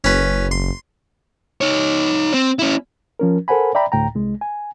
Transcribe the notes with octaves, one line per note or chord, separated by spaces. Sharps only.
F#1 C#4 B4
C6
D#4 C#5
C4
C#4 E4
F3 C#4 A#4
A4 A#4 C5 F#5 G#5 B5
D5 E5 G5 A#5 B5
D2 A2 G5 A#5
C2 G#3
G#5